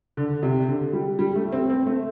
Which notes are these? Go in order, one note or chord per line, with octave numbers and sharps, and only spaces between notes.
D3
C3
D3
G3
G3
A3
C4
C4
A3